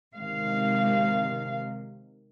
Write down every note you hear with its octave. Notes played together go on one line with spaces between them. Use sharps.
C3 D#3 G#3 F5